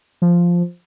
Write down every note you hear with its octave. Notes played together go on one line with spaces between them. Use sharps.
F3